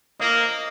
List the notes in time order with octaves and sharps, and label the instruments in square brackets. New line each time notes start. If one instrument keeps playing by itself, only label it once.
[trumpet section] A#3 [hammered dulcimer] D#5